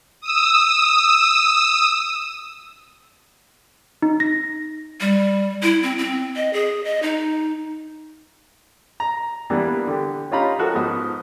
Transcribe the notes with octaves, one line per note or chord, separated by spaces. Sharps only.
D#6 E6
D#4
A#6
G3
E4
C4
C4
D#5
G#4
D#5
D#4
A#5
E3 G3 A#3 B3 D4
D3 G4
C#4 D#4 F4 G4 A#5 B5
F3 F#4 A4 A#4
G#2 F3 B3 D#4 D#5